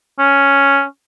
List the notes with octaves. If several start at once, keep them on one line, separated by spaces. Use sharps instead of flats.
C#4